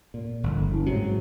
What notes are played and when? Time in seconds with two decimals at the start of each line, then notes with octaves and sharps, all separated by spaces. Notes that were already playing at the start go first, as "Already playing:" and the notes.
0.14 A#2
0.43 G1 F2
0.71 F#1
0.86 G#2 C3 F#3